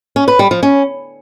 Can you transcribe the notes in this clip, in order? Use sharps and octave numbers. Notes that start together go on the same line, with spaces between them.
C#4
B4
G3
F3
C#4